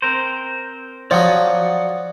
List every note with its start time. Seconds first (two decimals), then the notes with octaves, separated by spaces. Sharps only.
0.02 C4 A#4 C5
1.11 F3 F#3 D5 F#5 D#6